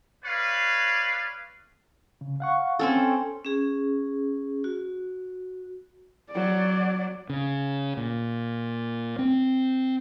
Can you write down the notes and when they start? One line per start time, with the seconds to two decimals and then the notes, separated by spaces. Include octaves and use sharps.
0.25 B4 C#5 D5 F5
2.21 C#3
2.40 F5 F#5 C#6
2.79 C4 C#4 A4
3.45 C#4 G#4
4.64 F#4
6.31 F#3 D5
7.30 C#3
7.97 A#2
9.19 C4